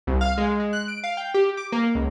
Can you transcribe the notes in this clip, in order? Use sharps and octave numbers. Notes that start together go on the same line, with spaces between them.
C2
F5
G#3
G#3
F#6
D7
F5
G5
G4
D6
A#3
C#2